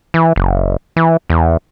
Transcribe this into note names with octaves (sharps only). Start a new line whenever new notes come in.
E3
F#1
E3
E2